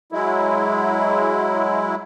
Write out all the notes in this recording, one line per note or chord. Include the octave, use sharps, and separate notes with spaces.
F#3 G#3 E4